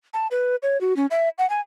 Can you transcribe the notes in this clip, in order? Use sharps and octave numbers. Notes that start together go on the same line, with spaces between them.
A5
B4
C#5
F#4
C#4
E5
F#5
G#5